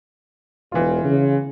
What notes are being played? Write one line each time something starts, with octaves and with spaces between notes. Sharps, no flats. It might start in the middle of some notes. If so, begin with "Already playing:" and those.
E1 E3 F4
C#3